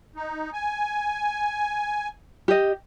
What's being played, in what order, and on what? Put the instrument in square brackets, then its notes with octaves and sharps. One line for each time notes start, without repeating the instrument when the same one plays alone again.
[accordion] D#4
G#5
[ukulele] G4 D#5